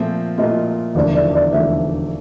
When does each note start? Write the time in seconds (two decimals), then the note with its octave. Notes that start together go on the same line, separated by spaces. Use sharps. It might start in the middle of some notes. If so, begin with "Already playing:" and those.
Already playing: A#2 F3 A3 C4 F4 E5
0.38 A#2 F3 A3 C4 F4 D#5
0.95 E1 D#2 D3 F3 A3 D5
1.14 D5
1.34 D5
1.52 E1 D#2 D3 F3 A3 E5